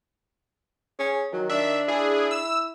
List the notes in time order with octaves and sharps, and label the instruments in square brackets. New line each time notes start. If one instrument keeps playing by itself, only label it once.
[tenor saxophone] C#4 [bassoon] G#4
[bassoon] D#3 [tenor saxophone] F#3
[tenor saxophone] D4 [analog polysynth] E5
[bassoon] E4 [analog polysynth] G#4
[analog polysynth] E6